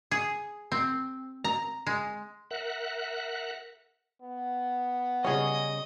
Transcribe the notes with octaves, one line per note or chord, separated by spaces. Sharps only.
G#4
C4
A#5
G#3
A#4 E5 F#5 F#6
B3
C#3 G3 C#4 G#4 D#5